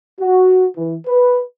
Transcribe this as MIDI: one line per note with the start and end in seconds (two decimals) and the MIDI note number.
0.20 0.66 66
0.77 0.96 52
1.07 1.42 71